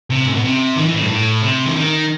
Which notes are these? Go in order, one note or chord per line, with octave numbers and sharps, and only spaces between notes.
C3
A2
B2
C3
D#3
E3
A2
G2
A2
C3
E3
D#3